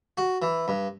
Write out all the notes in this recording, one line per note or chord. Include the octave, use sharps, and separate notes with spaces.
F#4
E3
G2